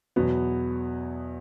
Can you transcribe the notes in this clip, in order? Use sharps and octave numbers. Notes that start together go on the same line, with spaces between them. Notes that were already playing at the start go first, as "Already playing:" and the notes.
E2 B2 F#3 B3